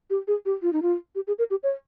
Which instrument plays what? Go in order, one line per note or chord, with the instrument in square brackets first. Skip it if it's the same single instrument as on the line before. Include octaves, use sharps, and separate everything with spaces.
[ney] G4
G#4
G4
F4
D#4
F4
G4
G#4
A#4
G4
C#5